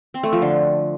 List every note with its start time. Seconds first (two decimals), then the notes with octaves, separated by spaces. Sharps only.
0.14 C4
0.23 A3
0.33 F3
0.42 D3